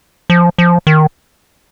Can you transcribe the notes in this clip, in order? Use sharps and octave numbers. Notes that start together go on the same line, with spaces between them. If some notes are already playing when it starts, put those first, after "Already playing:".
F3
F3
D#3